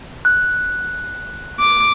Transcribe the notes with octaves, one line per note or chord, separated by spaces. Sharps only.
F#6
D6